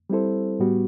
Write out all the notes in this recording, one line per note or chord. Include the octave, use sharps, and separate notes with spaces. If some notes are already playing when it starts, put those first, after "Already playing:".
G3 C4 E4 A4 C5
A2 G3 B3 F#4